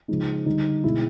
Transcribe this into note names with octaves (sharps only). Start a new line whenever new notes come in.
C#3 F3 G#3 D#4
D3 G3 D#4
B2 G#3 E4